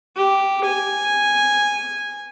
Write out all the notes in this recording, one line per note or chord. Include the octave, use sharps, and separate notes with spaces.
G4
G#5